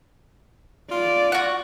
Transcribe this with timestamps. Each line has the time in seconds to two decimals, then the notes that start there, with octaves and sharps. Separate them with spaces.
0.91 F4 D5
1.32 F#4 F#5